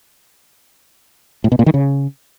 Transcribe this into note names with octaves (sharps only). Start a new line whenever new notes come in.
A2
B2
A#2
D#3
C#3